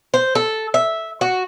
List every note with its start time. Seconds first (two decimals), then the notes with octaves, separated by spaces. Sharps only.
0.14 C5
0.35 A4
0.74 E5
1.21 F#4